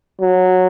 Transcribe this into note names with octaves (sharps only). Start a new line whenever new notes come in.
F#3